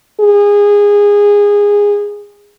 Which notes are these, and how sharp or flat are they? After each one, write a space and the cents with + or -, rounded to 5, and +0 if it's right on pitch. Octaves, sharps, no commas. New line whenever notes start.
G#4 -20